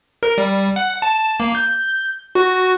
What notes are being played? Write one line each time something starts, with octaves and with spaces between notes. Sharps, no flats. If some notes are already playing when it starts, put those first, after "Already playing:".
A#4
G3
F#5
A5
A#3
G6
F#4